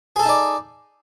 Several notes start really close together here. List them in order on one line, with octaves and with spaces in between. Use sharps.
G#4 A4 A5 D#4 D5